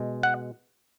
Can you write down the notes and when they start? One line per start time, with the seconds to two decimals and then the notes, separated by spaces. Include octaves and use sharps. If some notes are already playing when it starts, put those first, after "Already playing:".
Already playing: B2 G#3
0.23 F#5